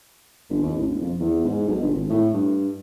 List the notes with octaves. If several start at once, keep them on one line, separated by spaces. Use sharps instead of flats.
G1
D#2
A1
E1
F2
E2
G#2
B1
G1
G#1
A2
G2